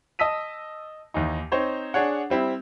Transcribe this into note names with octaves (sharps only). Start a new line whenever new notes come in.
D#5 A5 E6 B6 D#7
D#2 E3 D#4
C4 D#4 C5 C#5
D4 G#4 C#5 F#5
G3 C4 E4